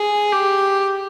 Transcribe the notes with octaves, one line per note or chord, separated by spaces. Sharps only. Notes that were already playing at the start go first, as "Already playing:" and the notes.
Already playing: G#4
G4